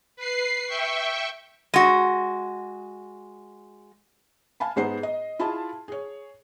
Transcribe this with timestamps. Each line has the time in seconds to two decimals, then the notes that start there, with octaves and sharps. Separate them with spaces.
0.16 B4 C7
0.66 E5 G5 C#6
1.74 G#3 F#4
4.60 F5 G#5 A5 B5
4.76 G#2 G#3 B3 C5 F#5 C7
5.03 D#5
5.39 E4 F4 G#4 E5 A5
5.88 G#4 C#5